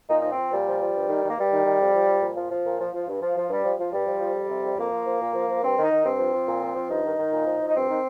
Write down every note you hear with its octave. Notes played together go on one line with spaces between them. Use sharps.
A#2 D#4
F3 D#4
C4
F3
A#2 G3
F3
F3
G2
D#3
D#3
A#3
G2 G3
D#3
D#3
F2
F3
F3
A#2 F3
F3
F3
A#2
F3
F3
G2
F3
F3
G2 G3
F3
F3
G2 G3
F3
F3
F2
C3
F2
F2 A#3
F3
F3
A#2
F3
F3
G2 C4
D#3
D#4
D#3
G2 C4
F3
F3
A#2
F3
F3
G2 D#4
D#3
D#3
A#2
F3
F3
D#4
G2 C4
D#3